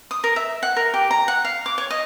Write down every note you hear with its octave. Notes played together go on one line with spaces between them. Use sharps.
D#6
A#4
E5
F#5
A#4
G4
A#5
F#5
F5
D6
C#5
D#5